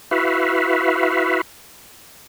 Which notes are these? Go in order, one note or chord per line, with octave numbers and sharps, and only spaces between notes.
E4 F#4 B4 E5 F5